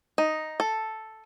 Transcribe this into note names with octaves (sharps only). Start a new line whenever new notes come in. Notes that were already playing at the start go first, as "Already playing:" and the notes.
D#4
A4